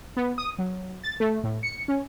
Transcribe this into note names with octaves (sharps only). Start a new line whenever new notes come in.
B3
D#6
F#3
A6
A3
A2
C#7
C#4